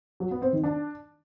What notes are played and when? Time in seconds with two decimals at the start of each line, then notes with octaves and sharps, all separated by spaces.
0.20 F#3
0.31 B3
0.42 C4
0.53 D#3
0.64 D4